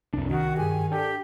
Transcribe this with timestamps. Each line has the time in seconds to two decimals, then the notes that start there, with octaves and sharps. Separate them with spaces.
0.13 C2 F2 D4
0.30 D#3 F#4
0.57 G2 G4 G#4 G#5
0.92 D4 G4 A4 G5